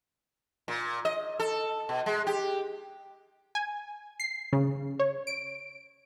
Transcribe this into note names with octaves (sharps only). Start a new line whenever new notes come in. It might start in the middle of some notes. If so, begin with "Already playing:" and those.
A#2
D#5
A4
B2
G#3
G4
G#5
C7
C#3
C#5
D7